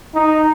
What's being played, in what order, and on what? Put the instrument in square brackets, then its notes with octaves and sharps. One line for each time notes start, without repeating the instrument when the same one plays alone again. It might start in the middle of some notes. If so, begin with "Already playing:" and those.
[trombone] D#4